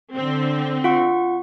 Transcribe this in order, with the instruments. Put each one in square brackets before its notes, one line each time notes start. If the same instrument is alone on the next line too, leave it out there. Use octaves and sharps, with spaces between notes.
[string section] D3 C4
[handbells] F4 F#5 C#6